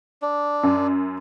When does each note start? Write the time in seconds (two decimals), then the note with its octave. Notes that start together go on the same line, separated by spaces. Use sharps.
0.22 D4
0.63 F#2